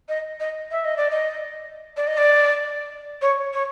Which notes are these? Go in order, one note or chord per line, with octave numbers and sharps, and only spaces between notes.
D#5
D#5
E5
D#5
D5
D#5
D5
D#5
D5
C#5
C#5